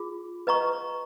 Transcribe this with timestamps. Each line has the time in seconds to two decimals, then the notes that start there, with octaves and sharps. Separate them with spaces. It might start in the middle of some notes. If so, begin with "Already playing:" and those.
Already playing: F4 G#4
0.47 B4 D#5 A#5 C#6